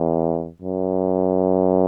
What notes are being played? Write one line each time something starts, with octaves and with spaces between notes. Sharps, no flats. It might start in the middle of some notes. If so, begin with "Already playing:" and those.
Already playing: E2
F#2